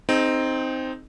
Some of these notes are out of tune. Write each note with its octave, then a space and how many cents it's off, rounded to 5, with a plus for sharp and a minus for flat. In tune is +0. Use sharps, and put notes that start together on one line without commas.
C4 +0 D#4 +0 G#4 +45